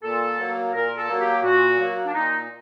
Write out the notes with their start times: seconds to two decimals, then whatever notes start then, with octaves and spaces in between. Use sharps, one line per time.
0.03 A#2 A4
0.38 F#3 A#3
0.73 A#2 A#4
0.96 A4
1.08 F#3 A#3
1.20 G4
1.42 A#2 F#4
1.77 F#3 A#3
2.06 D4
2.13 A#2 D#4